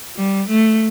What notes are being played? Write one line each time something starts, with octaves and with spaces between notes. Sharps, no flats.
G3
A3